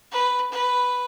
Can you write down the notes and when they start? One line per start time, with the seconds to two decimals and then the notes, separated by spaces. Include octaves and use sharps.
0.12 B4
0.52 B4